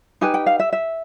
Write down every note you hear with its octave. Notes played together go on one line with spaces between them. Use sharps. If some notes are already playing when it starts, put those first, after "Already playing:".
D#4 G4 B4 G#5
G5
F5
E5
E5